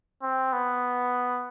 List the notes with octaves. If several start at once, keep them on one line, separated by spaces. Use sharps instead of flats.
C4
B3